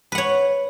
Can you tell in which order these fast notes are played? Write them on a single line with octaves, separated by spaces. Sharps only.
B4 F#5 C#5